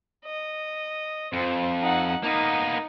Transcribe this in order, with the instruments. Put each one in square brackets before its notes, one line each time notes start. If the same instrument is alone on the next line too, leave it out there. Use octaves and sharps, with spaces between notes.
[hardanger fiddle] D#5
[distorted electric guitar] F2 [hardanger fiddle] C5
[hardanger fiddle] D#4 F#5
[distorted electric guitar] A#3 B3 [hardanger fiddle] D#4